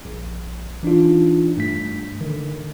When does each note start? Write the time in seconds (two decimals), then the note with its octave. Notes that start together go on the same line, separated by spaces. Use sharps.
0.05 A#1
0.83 E3 D4 D#4 F4
1.57 G2 A3 B6
2.21 D3 D#3